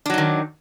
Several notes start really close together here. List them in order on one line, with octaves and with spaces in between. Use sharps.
D4 F#3 D#4 D#3